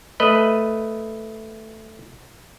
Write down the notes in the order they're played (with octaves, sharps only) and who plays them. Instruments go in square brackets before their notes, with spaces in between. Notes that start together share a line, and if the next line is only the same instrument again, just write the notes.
[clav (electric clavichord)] A3 B4 D#5